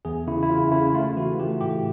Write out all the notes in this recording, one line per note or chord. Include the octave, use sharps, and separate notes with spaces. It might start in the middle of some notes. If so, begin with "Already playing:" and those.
E2 G#4
C#3 E4
E4
C#3 F4
C#3 E4
A3 F4
E3 F#4
A3 G4
A2 G4